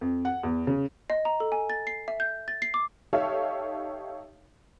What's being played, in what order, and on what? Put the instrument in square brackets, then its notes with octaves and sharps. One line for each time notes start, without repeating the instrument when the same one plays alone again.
[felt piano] F2
F#5
E2
C#3
[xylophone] D#5
A#5
A4
G#5
A6
C7
E5
G6
A6
C7
D6
[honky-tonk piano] D#4 G4 A4 C#5 E5 F5